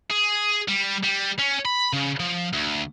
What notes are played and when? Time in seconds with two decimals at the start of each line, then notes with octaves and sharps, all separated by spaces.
0.11 G#4
0.68 G3
1.04 G3
1.39 C#4
1.65 B5
1.93 C#3
2.20 F3
2.53 D2